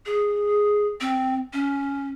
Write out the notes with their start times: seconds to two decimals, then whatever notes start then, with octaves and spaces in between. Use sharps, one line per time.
0.06 G#4
1.01 C4
1.53 C#4